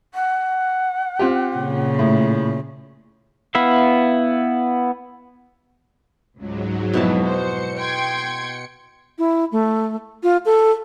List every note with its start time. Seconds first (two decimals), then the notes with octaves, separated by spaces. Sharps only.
0.14 F#5
1.19 C4 F4 G4
1.56 A#2 C#3
1.99 A2
3.55 B3 E4 E5 F5
6.38 C#2 G#2 F#3
6.93 F2 B2 E3 E4 A5
7.24 C5 C#7
7.78 G5 C6 G#6
9.18 E4
9.52 A3
10.23 F4
10.46 A4